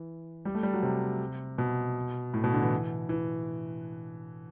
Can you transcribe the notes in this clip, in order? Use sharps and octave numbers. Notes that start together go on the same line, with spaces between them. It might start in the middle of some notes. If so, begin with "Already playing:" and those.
Already playing: E3
G3
A3
G3
F#3
C3
B2
A2
B2
D3
E3
E3